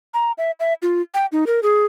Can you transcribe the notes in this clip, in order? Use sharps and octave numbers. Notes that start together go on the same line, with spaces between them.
A#5
E5
E5
F4
G5
D#4
A#4
G#4